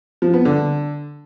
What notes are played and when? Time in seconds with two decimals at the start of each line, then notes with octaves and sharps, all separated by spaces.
0.22 F3
0.34 B3
0.45 D3